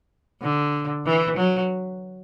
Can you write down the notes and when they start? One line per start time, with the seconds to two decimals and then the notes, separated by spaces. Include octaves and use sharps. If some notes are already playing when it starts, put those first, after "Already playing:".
0.42 D3
1.05 E3
1.37 F#3